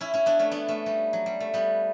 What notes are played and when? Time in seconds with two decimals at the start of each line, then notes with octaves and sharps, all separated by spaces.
0.01 C#4 E4
0.14 C#4 E4
0.26 B3 D4
0.39 A3 C#4
0.51 B3 D4
0.68 A3 C#4
0.86 G3 B3
1.13 F#3
1.26 G3
1.40 A3
1.54 G3 B3